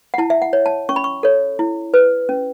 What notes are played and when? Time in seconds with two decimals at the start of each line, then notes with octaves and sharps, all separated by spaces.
0.14 F#5
0.18 E4 A5
0.30 E5
0.42 F#5
0.53 C#5
0.66 A5
0.89 C#4 C#6
0.96 B5
1.04 C#6
1.23 A4 C#5
1.59 E4
1.94 B4
2.29 C#4